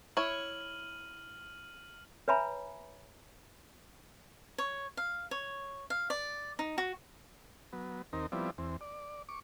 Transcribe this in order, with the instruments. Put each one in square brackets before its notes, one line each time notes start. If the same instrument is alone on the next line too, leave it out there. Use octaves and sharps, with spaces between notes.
[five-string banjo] E4 C#5 [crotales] F6 D#7 F#7
[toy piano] B4 C#5 E5 G#5 A#5 B5
[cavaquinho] C#5
F5
C#5
F5
D5
D#4
F#4
[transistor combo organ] F#3 B3
D#2 C4 D#4 A#4
F3 G3 B3 C4 E4 D5
E2 C4
D5
C#6 D6